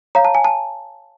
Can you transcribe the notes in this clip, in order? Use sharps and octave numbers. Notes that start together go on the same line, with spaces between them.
C#5 F5 A#5
A5
G#5
A5